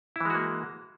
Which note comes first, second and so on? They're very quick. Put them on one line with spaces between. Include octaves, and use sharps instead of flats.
E4 E3 G#3 F#4 A#3